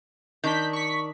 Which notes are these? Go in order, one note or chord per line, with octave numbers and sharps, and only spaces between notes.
D#3 D4 G6 B6
C#6 B6